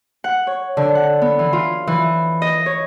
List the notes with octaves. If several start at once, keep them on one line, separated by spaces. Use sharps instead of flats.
F#5
C#5
D3
F#5
B3
E3
F4
E3
D#5
C#5